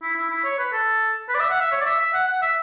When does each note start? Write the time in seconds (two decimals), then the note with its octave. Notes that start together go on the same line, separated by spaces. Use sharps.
0.02 E4
0.16 E4
0.30 E4
0.44 C#5
0.58 B4
0.73 A4
1.29 B4
1.34 D5
1.40 E5
1.50 F#5
1.60 E5
1.72 C#5
1.81 D5
1.85 E5
1.99 E5
2.13 F#5
2.27 F#5
2.42 E5